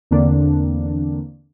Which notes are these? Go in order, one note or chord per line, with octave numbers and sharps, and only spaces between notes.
E2 D3 A#3 C4 D4